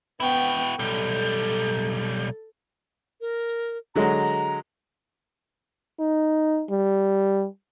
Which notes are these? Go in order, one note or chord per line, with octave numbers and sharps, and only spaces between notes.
B3 E4 F#4 G5
B1 G3 A4
A#4
D3 F#3 G#3 A#5
D#4
G3